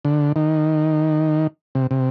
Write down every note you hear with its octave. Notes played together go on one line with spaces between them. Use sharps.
D3
D#3
C3
C3